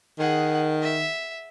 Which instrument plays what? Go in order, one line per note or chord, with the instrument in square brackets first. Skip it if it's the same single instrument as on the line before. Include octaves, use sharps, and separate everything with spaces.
[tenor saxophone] D#3 [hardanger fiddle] G#4 F#5
[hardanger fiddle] E5